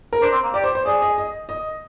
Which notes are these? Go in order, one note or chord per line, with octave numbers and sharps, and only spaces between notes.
A#4
D4 C5
C4
A#3
G4 D5
C5
C5
G#4 D5
D#5
D#5
D#5